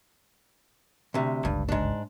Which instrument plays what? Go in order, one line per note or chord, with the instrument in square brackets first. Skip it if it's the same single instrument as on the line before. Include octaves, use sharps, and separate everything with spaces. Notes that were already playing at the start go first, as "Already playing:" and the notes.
[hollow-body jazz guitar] D2 C3
[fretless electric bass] G1 C#2 [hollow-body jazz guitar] G2
[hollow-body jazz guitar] G#2 D4